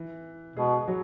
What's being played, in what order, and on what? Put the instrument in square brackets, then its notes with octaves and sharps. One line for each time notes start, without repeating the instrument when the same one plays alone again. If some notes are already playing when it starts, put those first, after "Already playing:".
Already playing: [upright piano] E3
[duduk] B2 [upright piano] G#3 G#4
[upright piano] F#3 F#4